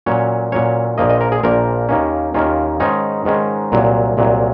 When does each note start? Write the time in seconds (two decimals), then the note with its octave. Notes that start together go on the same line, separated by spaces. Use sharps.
0.06 A#2 F#3 C#4 C#5
0.52 A#2 F#3 C#4 C#5
0.98 A#1 A#2 F3 A#3 D#5
1.09 D#5
1.21 A#4
1.32 G#4
1.43 A#1 A#2 F3 A#3 A#4
1.89 D#2 D#3 A#3 C#4
2.34 D#2 D#3 A#3 C#4 F4
2.80 G#2 D#3 G#3 C#4 D#4
3.25 G#2 D#3 G#3 C#4
3.72 C2 A#2 F#3
4.17 C2 A#2 F#3